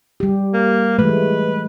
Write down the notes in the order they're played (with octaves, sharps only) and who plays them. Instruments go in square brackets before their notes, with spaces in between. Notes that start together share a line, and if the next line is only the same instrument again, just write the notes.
[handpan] G3 G4
[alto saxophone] A#3
[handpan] E3 G#3 A3 [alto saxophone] B4